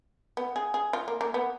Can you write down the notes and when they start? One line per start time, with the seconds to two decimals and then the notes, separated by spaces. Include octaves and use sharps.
0.37 B3
0.56 G#4
0.74 G#4
0.93 F4
1.08 A#3
1.21 A#3
1.34 B3